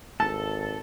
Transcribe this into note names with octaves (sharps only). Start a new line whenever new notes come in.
G#1 A4 A5